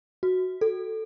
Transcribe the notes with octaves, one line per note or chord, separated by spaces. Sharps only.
F#4
A4